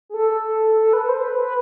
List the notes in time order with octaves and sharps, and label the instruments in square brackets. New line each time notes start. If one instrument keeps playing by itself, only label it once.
[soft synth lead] G#4
A4
A4
B4
C5
B4
B4